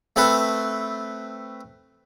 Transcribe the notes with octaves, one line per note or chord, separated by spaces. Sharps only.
A3 C4 A4 B4